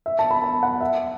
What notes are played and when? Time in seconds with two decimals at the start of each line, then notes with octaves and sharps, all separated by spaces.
0.06 E5
0.19 A5
0.31 B5
0.44 A5
0.63 F#5
0.81 E5